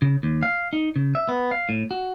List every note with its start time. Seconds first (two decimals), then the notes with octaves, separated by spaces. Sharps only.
0.02 C#3
0.23 D#2
0.43 F5
0.73 D#4
0.96 C#3
1.15 E5
1.29 B3
1.51 F5
1.69 A2
1.91 F#4